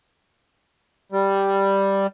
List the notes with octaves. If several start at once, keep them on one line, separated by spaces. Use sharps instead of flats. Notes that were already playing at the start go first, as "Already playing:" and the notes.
G3